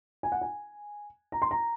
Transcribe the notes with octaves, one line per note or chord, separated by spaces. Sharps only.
G#5
F#5
G#5
A#5
C6
A#5